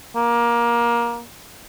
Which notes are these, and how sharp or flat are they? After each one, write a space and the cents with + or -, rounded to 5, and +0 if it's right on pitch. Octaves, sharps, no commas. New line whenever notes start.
A#3 +20